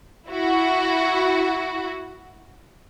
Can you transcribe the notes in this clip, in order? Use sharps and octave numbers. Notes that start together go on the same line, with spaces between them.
E4 F#4